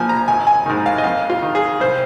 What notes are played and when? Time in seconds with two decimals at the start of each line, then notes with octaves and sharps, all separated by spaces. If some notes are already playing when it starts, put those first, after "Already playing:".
Already playing: A#1 A#2 F3 G#5
0.09 A#5
0.28 G#1 G#5
0.47 G#5
0.66 G#2 D#3
0.86 F5
0.98 D#5
1.04 F2 F5
1.30 F4
1.42 D#3
1.55 G#4
1.80 C2 C5